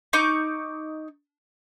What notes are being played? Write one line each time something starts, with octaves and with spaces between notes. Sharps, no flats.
D#4 C#6 D6